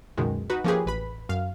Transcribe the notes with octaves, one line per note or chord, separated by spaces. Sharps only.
C#2 F#2 B2 D#3 G#3
D#4 F#4 B4
F3 A#3 C#4 G4 G#4 B4
A1 B4 B5
F#2 F5